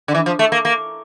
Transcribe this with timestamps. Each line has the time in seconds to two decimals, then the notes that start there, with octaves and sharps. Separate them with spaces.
0.08 D3
0.15 E3
0.26 F3
0.39 A3
0.52 A#3
0.65 A#3